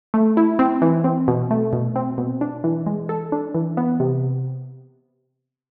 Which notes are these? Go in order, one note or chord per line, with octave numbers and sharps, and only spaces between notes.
A3
E4
C4
E3
C4
B2
A3
B2
C4
B2
D4
E3
G#3
A4
D4
E3
B3
C3